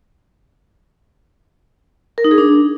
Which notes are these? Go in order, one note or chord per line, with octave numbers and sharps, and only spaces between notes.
A#4
D#4
G#4
D4